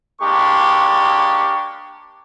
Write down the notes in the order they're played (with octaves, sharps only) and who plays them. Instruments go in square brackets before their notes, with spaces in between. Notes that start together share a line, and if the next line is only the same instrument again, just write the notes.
[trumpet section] G#3 A#3 D4 G4 C#6